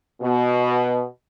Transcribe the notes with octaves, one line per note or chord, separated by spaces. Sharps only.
B2